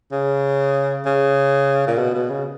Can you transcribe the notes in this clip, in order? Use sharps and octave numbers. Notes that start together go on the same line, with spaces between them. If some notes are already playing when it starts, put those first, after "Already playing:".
C#3
C#3
A#2
B2
B2
C#3